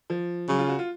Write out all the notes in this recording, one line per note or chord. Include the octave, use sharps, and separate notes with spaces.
F3
C#3 F#3
F4
F#4
F4